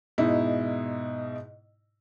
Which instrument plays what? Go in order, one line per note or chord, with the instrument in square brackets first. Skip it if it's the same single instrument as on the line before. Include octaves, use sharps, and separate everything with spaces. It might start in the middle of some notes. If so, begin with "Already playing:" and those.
[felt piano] G#2 B2 D#4 E4